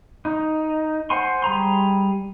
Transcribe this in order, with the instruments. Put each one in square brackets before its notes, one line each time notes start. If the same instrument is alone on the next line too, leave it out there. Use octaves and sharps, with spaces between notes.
[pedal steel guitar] D#4
C5 F#5 G#5 C6
G3 G#4 A#5 C6